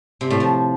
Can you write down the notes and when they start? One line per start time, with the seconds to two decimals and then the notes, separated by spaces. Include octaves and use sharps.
0.21 C3
0.30 A2
0.40 F3